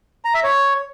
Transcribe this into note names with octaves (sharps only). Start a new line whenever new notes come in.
A#5
E5
C#5